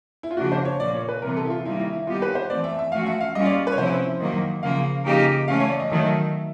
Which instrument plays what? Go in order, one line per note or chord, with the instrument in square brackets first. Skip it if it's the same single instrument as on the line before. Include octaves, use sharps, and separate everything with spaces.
[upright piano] E4
F4
[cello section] C#3 F3 A#3 D4 [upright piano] F#4
[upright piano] C5
C#5
[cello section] A#2 F3 A#3 [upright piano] D5
[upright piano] C#5
B4
[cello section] C3 E3 G3 B3 [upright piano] A#4
[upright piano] A4
E4
F4
[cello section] D#3 G3 A#3 [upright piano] E4
[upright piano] E4
E4
[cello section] G3 B3 D#4 G4 [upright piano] F4
[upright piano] B4
C5
[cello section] E3 A3 C4 [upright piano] D5
[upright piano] E5
E5
[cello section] F3 A3 C#4 F#4 [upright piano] F5
[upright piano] E5
F5
[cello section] G3 A#3 C#4 F4 [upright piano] D#5
[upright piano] D5
B4
C#5
[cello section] C3 F3 A3 C#4 E4 [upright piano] C5
[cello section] D#3 F#3 A#3
[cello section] C#3 F3 A#3 [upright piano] F5
[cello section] C#3 F3 A#3 D#4 G4
[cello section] E3 A3 C#4 [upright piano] F5
[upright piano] C#5
D5
D#5
[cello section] D#3 F#3 A3 [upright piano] E5